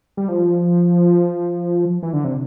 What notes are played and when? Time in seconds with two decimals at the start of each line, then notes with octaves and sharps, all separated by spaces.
0.17 G3
0.28 F3
2.03 E3
2.13 D3
2.24 C3